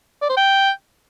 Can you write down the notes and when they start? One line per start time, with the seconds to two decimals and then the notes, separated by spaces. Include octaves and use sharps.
0.21 D5
0.29 C5
0.37 G5